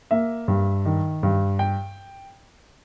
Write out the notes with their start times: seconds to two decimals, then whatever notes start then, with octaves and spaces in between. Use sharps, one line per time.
0.11 A#3 E5
0.48 G2
0.86 D#3
1.23 G2
1.59 G5